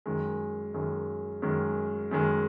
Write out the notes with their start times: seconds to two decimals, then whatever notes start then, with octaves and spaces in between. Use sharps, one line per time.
0.06 F#2 D#3 G#3
0.74 F#2 D#3 G#3
1.42 F#2 D#3 G#3
2.11 F#2 D#3 G#3